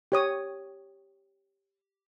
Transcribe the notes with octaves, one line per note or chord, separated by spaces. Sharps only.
G4 C#5 D#6